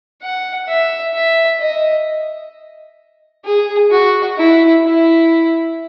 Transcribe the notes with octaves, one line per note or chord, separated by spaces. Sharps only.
F#5
E5
E5
D#5
G#4
F#4
E4
E4